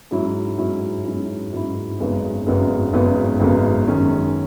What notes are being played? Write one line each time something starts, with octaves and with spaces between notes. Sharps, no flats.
G#2 F#3 C#4 E4
G#2 F#3 C#4 E4
G#2 F#3 C#4 E4
G#2 F#3 C#4 E4
G#1 F#2 C#3 G#3 B3
G#1 F#2 C#3 G#3 B3
G#1 F#2 C#3 G#3 B3
G#1 F#2 C#3 G#3 B3
F#2 D#3 G#3 C#4